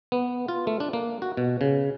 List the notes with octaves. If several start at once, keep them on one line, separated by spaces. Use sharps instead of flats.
B3
F4
A3
D4
A#3
F#4
B2
C#3